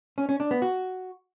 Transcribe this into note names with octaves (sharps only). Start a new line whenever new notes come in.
C#4
C#4
D4
B3
F#4